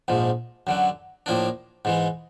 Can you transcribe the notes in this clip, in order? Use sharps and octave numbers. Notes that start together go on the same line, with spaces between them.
A#1 G#2 F3
F#2 D3 F#3
A2 F3 A#3 D4
G#2 E3 G#3